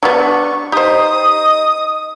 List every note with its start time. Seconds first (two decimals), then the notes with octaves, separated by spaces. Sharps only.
0.03 F#3 G3 B3 D4 C#6
0.72 D#4 G4 C5 D#5 D#6